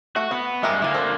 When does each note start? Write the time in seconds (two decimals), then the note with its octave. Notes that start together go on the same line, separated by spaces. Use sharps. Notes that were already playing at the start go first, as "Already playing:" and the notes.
0.16 A3 F#4
0.31 B3 F#5
0.63 G2 G#3 G4 A#4 E5
0.82 D3 A#3 E4 G#5
0.94 A4 C5